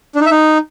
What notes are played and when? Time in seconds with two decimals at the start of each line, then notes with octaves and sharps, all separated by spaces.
0.15 D4
0.20 D#4
0.26 E5
0.31 D#4